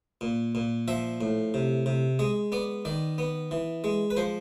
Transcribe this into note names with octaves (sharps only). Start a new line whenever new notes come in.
A#2
A#2
F3 E5
A2
C3
C3
G#3 D#5
B3 D5
D#3 D5
B3
E3
G#3
B4
F3 C5